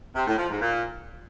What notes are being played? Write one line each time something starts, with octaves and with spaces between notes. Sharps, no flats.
C3
A2
F3
G#2
A#2